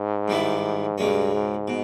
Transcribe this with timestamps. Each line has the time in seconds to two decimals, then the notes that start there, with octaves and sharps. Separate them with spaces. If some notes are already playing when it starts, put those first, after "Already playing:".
Already playing: G#2
0.28 G2 D#3 G3 B3 E4
0.98 C#2 G2 B2 G#3 C#4
1.33 G#2
1.68 B2